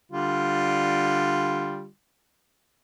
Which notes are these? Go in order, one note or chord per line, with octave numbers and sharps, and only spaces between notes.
D3 G3 F4